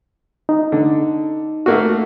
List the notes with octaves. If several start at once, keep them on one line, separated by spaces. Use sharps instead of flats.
D#4
D3
A3 A#3 F#4